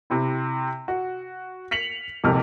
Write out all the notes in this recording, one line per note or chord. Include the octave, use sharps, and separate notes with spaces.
C3 C4 E4
F#4
B6 C#7 F7 F#7
D#1 C2 F2 C3 G#3 F6